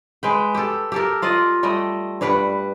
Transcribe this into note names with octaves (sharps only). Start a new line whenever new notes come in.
G#3 B4 G5
G4 A4
G4 A4 A#4
F4 D5 D#5
G3 A3 D#5
G2 G3 B4 F#5